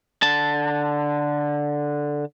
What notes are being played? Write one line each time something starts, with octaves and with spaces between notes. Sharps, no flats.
D3 A5